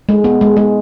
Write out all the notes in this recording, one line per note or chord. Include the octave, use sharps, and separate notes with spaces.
G#3
B3
G#3
G#3